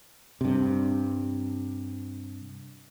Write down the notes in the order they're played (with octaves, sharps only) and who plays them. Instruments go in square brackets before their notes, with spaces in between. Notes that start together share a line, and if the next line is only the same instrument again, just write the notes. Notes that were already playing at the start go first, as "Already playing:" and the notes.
[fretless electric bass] G2 C3